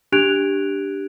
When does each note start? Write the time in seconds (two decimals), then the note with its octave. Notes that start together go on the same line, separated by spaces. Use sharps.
0.12 D4 G4 F#6 G#6 D7 F7